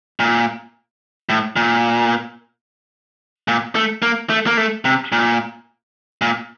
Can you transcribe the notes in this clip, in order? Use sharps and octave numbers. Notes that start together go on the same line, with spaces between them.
A#2
A2
A#2
A#2
A3
A#3
A3
A#3
A3
C3
A#2
A#2